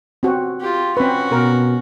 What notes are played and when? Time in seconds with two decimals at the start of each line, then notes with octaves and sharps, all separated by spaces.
0.23 C4 F#4
0.60 F4 G4
0.97 C4 C#4 F#4 B4
1.32 B2 A#4